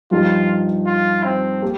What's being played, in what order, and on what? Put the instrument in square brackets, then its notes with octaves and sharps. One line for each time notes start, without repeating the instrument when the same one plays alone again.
[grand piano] G2 F3 D#4 G4 [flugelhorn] F4
[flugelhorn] F4
C4
[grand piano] A#3 G4